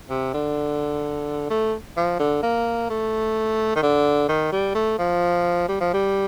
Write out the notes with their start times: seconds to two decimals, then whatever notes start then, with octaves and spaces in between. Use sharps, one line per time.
0.10 C3
0.34 D3
1.50 A3
1.97 F3
2.20 D3
2.43 A#3
2.90 A3
3.75 D#3
3.82 D3
4.29 D#3
4.52 G3
4.75 A3
4.99 F3
5.68 G3
5.80 F3
5.93 G3